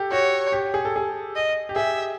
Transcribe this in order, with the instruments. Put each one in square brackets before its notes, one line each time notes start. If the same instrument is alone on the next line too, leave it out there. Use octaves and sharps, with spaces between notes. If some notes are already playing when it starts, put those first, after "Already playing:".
Already playing: [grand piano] G4 A4
[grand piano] F#4 [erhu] C#5
[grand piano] G4
G#4
A4
G#4
[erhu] D#5
[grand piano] G4
[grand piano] G#4 [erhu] E5